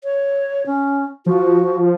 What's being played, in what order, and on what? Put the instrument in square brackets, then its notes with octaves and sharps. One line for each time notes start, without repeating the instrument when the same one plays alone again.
[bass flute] C#5
C#4
[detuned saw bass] F3 [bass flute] F#4